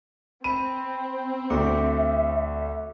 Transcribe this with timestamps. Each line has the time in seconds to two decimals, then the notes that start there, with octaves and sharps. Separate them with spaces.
0.44 C4 B5 D#7
1.50 D2 F#4 E5 D6 C#7